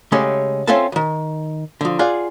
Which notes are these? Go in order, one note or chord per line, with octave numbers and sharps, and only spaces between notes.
C#3 G#3 A3 C#4 G4 A4
C4 C#4 F4 A4 E5 A5
C#2 D#3
D3 F3
F4 G#4 D5 F#5